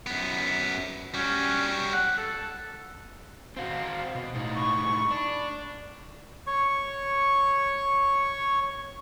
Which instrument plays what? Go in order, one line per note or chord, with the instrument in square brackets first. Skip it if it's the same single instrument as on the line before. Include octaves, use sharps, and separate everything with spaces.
[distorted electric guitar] F#2 B3
[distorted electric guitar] G3 F#4 [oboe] C#4
[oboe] F#5
A4
[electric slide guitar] C4 F#4 [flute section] F5
[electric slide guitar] B2
A2 D#4
[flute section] B5 C#6
[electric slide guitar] D4
[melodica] C#5 C#6